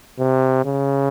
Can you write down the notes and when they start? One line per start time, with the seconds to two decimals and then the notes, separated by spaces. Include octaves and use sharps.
0.18 C3
0.65 C#3